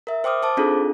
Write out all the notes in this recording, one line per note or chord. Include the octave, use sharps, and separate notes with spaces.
A#4 E5
C5 G5 D6 D#6 F6
C5 A5 D6
C4 D4 D#4 F4 G#4 A4